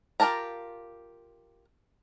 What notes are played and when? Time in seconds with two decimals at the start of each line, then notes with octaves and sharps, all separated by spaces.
0.20 F4 G4 A#4 A5 A#5